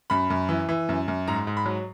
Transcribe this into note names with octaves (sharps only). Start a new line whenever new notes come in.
F#2 B5
F#2
E3
E3
F#2
F#2
G#2 A#5
G#2
B5
F#3